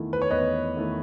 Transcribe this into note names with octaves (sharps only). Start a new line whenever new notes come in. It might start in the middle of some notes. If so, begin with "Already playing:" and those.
Already playing: E2 D#3 A3 E4
B4
C#5
E2 B4 D#5
D#3 A3 E4